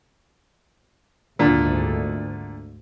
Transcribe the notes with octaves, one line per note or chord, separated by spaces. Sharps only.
G#1 D2 A#2 D3